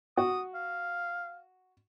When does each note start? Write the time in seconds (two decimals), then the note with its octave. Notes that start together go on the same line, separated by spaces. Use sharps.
0.17 F#4 D#6
0.55 F5